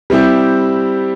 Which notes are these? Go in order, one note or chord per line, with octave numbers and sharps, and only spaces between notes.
G3 C4 E4 G4